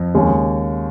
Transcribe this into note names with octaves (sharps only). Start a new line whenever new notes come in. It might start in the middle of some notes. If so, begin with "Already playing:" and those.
Already playing: F2
D#2 C#3 G#3 C#4 G#4